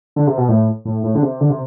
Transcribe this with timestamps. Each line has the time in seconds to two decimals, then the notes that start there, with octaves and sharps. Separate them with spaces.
0.16 D3
0.27 C3
0.38 B2
0.49 A2
0.85 A2
1.04 A2
1.15 D3
1.23 C3
1.41 D3
1.50 C3